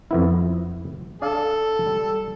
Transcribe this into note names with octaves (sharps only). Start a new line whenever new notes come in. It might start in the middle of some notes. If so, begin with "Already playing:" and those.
F2 B3 E4
D4 A4 D5 F5
G3